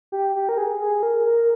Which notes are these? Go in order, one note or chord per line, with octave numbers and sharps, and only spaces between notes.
G4
G4
A#4
G#4
G#4
A#4
A#4